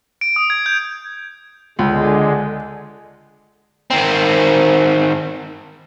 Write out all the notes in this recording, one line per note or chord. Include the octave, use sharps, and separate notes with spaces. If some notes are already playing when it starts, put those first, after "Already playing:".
D7
D#6
G#6
G6
C#2 D3 G#3
D#3 C4